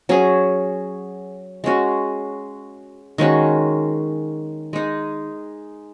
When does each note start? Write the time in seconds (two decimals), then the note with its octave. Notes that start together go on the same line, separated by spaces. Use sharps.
0.09 F#3 C#4 G#4
1.64 G#3 C#4 F#4
3.18 D#3 G#3 C#4 F#4
4.73 G#3 D#4 G#4